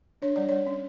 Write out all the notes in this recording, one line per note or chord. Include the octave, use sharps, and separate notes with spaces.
D4 C#5
G3 D5
G3 C#5
C#4